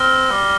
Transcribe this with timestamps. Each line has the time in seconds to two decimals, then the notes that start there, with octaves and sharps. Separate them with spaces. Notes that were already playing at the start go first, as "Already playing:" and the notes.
Already playing: C4 F6 A#6 G7
0.31 G3